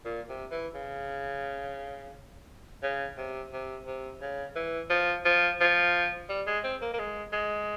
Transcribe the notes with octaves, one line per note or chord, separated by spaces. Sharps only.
A#2
C3
E3
C#3
C#3
C3
C3
C3
C#3
E3
F3
F3
F3
G3
G#3
C4
A#3
A#3
G#3
G#3